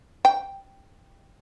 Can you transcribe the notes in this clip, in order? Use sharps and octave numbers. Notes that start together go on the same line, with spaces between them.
G5